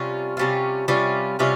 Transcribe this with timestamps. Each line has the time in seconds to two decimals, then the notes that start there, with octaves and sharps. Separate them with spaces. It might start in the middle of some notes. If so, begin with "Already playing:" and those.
Already playing: C3 G3 C#4 F4
0.37 C3 G3 C#4 F4
0.88 C3 G3 C#4 F4
1.39 C3 G3 C#4 F4